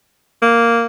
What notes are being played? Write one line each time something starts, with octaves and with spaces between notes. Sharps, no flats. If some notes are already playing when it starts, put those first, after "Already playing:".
A#3